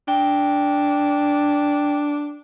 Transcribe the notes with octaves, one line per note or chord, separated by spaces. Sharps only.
D4 G5